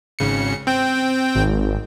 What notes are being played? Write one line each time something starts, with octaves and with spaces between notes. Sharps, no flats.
G#1 C#3 C#7
C4 G5
G#1